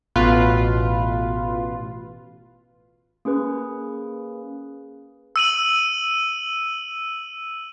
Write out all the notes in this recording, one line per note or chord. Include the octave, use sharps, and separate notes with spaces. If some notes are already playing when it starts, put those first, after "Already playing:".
A1 B2 F4 B4
A#3 C#4 G#4 B4
E6 D#7 F#7